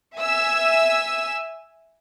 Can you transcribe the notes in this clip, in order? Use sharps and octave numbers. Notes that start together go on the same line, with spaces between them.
E5 G#5 E6